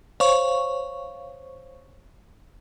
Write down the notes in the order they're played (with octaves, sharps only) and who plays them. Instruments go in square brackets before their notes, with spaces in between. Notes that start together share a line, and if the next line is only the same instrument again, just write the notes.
[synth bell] C5 C#5 F5 C#6